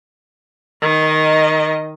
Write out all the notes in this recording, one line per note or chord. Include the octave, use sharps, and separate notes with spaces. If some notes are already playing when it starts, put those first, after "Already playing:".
D#3 D#5